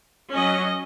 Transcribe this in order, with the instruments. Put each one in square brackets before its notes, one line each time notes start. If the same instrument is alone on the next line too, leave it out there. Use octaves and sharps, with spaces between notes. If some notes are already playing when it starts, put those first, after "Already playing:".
[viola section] F#3 C#4 D#5